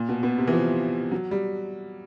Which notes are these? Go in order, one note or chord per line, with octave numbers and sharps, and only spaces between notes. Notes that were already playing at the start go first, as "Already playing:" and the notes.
Already playing: A#2
B2
B2
C3
E3
F3
F#3
G3